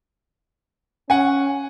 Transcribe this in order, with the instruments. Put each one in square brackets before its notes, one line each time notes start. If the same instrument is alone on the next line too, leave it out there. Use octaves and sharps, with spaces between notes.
[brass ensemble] C#4 [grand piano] F#5 G#5